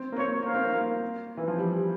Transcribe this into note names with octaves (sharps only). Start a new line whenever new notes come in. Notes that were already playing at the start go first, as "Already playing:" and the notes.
Already playing: C4
A#3
C4 C#5
A#3 F5
C4
A#3
A#3
E3
F3
G3